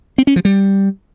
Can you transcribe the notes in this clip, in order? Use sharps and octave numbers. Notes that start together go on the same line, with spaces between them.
C4
C#4
F3
G3